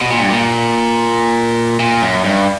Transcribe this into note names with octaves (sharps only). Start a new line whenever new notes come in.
B2
A#2
G2
A#2
A#2
F#2
G2